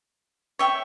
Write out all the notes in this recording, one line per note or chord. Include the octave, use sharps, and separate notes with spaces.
C#5 E5 G5